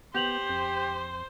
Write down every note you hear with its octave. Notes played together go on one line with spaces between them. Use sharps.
B3 G4 C5 G6 F7 F#7
F2